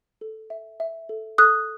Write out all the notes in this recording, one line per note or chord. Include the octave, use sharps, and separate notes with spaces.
A4
E5
E5
A4
A4 D#6 F#6